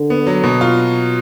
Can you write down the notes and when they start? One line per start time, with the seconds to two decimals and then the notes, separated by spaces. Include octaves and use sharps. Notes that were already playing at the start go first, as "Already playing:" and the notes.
Already playing: D3
0.10 B3
0.27 F#3
0.43 B2
0.61 F4